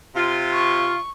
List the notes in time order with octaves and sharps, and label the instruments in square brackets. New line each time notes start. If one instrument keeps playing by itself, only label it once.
[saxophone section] C3 F4
[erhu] C#6